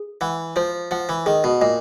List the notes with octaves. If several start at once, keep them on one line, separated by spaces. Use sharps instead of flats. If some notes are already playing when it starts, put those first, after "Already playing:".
Already playing: G#4
E3 F#5
F3 C5
F3 F#5
E3
D#3 G#4
B2
A#2 D#5